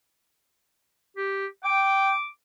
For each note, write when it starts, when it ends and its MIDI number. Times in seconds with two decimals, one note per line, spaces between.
1.17 1.46 67
1.64 2.13 79
1.64 2.27 86